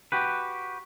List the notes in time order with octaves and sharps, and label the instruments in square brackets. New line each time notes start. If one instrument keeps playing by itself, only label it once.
[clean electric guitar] F#4 G4 B4